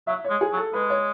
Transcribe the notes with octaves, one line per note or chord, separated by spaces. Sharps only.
F#3 E5
G#3 C#5
G#4
F#3
A4
G#3 B4
C#5